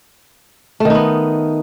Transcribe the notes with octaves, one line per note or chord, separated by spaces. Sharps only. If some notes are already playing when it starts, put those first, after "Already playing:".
D#3 A3 B3 D#4